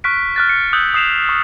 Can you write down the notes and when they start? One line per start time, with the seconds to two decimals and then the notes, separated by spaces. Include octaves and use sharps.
0.04 C#6 F6 F#6 B6 D7
0.36 F6 F#6 A6
0.49 C#7
0.73 D#6 E6 F#6 G6 F#7
0.94 D#6 C7 E7 F7
1.29 C#6